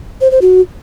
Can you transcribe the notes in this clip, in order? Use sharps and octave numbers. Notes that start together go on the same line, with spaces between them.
C5
C5
F#4